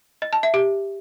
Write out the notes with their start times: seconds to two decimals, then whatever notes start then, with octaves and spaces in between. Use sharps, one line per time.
0.22 D#5
0.33 A5
0.43 E5
0.54 G4